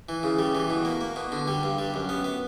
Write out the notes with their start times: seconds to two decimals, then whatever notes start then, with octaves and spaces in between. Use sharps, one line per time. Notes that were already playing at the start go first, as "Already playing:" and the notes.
0.09 E3
0.23 C#3
0.39 G3
0.55 E3
0.70 B2
0.85 A#3
1.01 A#3
1.16 B2
1.32 D3
1.48 G3
1.63 G2
1.78 G3
1.94 F#2
2.09 B3
2.24 B3